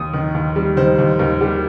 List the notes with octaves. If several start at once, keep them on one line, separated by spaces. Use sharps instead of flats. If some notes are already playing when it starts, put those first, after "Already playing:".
Already playing: D#2 D#6
D#3
D#2
G3
D#3 C5
D#2
D#2 A#4
G3 G4